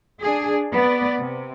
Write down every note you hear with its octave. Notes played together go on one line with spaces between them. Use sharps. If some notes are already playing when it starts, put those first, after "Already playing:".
D4 G#4
B3 D5
C3